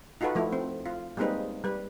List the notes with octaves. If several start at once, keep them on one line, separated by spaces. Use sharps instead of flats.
D#4 F4 F#4 A4 B4
F3 A3 E4
C4
F4
G3 G#3 A#3 C4 D#4 B4
G3 B4